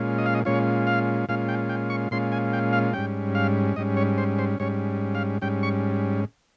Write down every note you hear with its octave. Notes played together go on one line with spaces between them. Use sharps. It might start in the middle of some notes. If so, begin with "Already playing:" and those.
Already playing: A#2 G#3 C#4 F4
D#5
F5
D#5
A#2 G#3 C#4 F4 C#5
F5
A#2 G#3 C#4 F4 F5
G5
G5
C#6
A#2 G#3 C#4 F4 C6
G#5
G5
F5
G#2 G3 C#4 G5
F5
G#2 G3 C#4 D#5
C#5
C5
C5
G#2 G3 C#4 C#5
F5
G#2 G3 C#4 G5
C#6